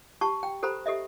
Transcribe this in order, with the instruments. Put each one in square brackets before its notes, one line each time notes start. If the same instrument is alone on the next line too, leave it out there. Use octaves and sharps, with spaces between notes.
[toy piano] G4 A5 B5 C#6
G5
G4 A4 C5 A#5 B5
G4 A4 D#5 E5